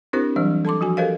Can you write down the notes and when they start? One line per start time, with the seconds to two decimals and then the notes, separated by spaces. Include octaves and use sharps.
0.13 C4 D4 E4 G4 A#4 C5
0.36 E3 F#3 G3 D4 C5
0.65 A4 A5 C6 D6
0.81 F3 F#4 G#5
0.97 G4 A4 A#4 C5 D#5 F5